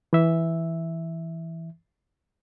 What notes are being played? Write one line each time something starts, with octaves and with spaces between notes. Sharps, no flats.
E3 E5